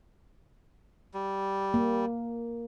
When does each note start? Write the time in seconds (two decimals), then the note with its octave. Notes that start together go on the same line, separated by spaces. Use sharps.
1.14 G3
1.74 A#3